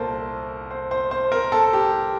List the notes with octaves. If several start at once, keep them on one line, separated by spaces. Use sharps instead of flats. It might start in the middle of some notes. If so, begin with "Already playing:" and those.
Already playing: C2 A#2 A4 A#4 C5
C5
C5
C5
A#4
A4
G4